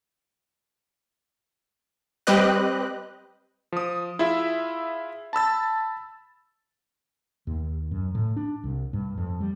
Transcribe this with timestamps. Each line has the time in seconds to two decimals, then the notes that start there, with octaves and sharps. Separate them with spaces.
2.27 G3 C4 G4 B4 D#5 F#6
3.72 F3 D#6
4.19 E4 F4 G#4 E5
5.33 A5 B5 E6 A6
7.47 D#2
7.91 F#2
8.15 A2
8.36 D4
8.64 C2
8.93 G2
9.17 F2
9.41 G3